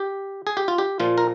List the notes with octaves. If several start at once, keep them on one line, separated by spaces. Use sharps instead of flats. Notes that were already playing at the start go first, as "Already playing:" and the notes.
Already playing: G4
G#4
G4
F4
G4
A#2 F3 F4
A#4